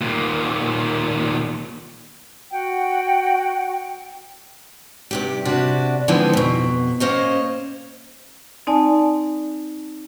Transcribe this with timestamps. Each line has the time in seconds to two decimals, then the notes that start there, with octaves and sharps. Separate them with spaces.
0.01 D#2 A#2
2.52 F#4 F#5 G5
5.11 G2 C3 G4
5.45 C3 D4 F#4
6.08 D3 E3 F3 G#3 B3 C4
6.33 F2 B2
7.00 A#3 C#4 C5 D#5
8.67 C4 D#4 D5 G#5 A5